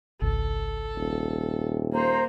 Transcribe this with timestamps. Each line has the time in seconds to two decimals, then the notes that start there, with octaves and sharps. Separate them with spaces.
0.22 G#1 C#2 A4
0.96 D#1
1.93 A#3 C5 A#5